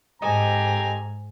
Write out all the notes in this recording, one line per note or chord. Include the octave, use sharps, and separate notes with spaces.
G#2 C4 G4 A4 D#5 G#5 A#5